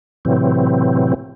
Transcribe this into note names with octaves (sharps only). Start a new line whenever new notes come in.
A2 C3 E3 F#3 C4